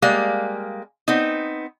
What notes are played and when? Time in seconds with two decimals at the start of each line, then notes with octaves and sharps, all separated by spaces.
0.02 G3 G#3 A#3 F5
1.08 B3 C4 D#4